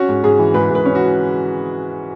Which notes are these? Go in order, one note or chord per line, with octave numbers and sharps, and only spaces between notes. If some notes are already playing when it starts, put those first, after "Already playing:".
Already playing: C#4 F#4
G#2
G#2 G#4
E3
G#2 B4
G#2 B4
C#4
F#4